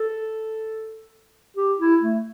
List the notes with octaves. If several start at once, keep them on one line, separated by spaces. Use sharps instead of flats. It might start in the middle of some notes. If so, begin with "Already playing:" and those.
Already playing: A4
G4
E4
A3